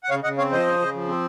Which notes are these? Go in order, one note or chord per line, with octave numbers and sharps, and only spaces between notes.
F#5
C#3 C#5 F5
C#3 D#5 F#5
C4 C#5 F5
F3 C5 D#5
C#3
C#3
F3
C4